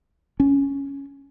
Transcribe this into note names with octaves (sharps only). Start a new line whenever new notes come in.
C#4